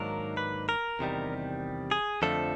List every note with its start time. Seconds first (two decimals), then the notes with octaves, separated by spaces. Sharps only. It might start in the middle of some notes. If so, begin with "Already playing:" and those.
Already playing: G#2 D#3 F#3 A#3 D4 A#4
0.37 B4
0.69 A#4
0.99 E2 C3 D#3 G3
1.91 G#4
2.22 F2 D3 F3 A3 A4